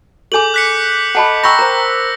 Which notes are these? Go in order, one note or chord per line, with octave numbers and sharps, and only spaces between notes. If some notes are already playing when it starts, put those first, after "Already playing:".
G#4 A4 G#5 D6 G6 F#7
F#6 B6 C#7
A4 D#5 F#5 A5 B5
G5 A#5 B5 C#6 E6 G6 A#6
A#4 C5 A#5